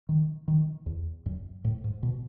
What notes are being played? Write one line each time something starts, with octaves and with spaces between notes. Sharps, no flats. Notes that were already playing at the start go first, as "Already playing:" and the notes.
D#3
D#3
E2
F#2
A2
G#2
B2